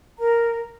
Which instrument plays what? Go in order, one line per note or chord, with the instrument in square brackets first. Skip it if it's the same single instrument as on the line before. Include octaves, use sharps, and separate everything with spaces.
[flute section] A#4 A#5